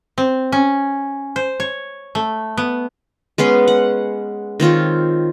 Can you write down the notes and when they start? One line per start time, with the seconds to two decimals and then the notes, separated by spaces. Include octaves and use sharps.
0.18 C4
0.52 C#4
1.36 C5
1.60 C#5
2.15 A3
2.58 B3
3.38 G#3 B3 C#4 C6
3.68 F#5
4.60 D#3 C4 F4 C#5